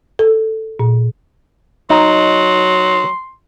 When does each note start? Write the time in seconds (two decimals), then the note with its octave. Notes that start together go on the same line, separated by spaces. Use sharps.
0.19 A4
0.79 A#2
1.90 F#3 D#4 C6